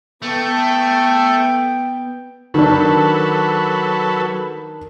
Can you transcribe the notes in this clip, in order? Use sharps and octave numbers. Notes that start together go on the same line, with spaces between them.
A3 B3 G5
D#3 F#3 D4 A4 B4